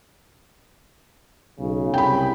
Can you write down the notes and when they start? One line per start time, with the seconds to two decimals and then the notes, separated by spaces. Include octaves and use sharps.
1.60 B1 C#3
1.94 C2 G5 B5